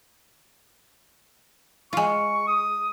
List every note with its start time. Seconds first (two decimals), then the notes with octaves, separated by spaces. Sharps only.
1.93 G#3 F4 C#6
2.47 D#6